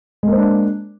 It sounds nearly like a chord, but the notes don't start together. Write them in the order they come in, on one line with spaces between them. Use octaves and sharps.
G#3 A#3 C5 D4